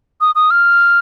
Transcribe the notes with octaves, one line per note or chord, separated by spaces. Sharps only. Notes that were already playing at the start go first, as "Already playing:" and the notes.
D#6
D#6
F6